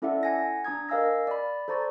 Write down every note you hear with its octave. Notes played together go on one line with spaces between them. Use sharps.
C#4 E4 A4 D5 E5 F#5
F#5 G#5 A#6
D4 A#5 D#6 G#6
A#4 D#5 F5 G#5 E6 A#6
D5 B5
A4 C5 D5 A#5 C#6 A6